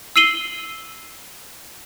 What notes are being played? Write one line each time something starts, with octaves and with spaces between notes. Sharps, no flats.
E6 C7 D#7 F#7 G7